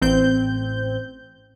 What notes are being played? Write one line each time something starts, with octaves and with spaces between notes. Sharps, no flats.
A1 C4 G6